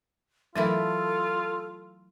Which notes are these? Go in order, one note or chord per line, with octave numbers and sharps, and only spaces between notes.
E3 F#3 A3 E4 F4 A4 A#4